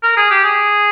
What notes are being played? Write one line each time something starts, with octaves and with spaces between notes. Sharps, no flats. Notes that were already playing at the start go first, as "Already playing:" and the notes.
A#4
G#4
G4
G#4